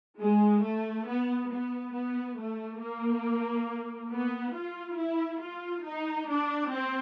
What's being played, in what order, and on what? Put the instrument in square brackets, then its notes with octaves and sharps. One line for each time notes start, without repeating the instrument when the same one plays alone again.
[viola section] G#3
A3
B3
B3
B3
A3
A#3
B3
F4
E4
F4
D#4
D4
C4